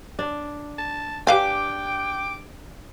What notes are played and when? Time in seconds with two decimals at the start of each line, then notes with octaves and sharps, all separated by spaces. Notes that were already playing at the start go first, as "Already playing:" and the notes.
0.19 D4
0.78 A5
1.27 D4 G4 B4 F5 G5 G#5 D6